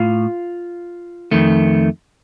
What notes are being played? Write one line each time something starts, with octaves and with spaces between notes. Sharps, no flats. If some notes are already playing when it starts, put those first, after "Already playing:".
Already playing: A2 F4 F5
F2 D#3 A3